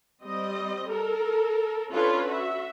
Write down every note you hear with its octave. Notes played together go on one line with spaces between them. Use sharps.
G3 C4 D#5
A4 A#4
C#4 D4 F4 A4 B4 C#5
F#4 E5